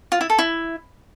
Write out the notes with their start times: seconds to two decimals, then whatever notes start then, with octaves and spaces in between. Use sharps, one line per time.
0.12 F4
0.21 E4
0.30 A4
0.39 E4